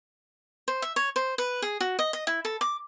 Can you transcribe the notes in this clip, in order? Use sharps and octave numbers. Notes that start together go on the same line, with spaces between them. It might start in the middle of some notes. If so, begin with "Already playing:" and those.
C5
E5
C#5
C5
B4
G#4
F#4
D#5
D#5
E4
A4
D6